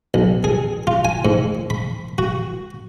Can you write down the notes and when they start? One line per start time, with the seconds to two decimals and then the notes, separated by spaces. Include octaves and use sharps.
0.14 B1
0.44 G#4
0.87 F4
1.05 G#5
1.25 G#2
1.70 B5
2.18 F#4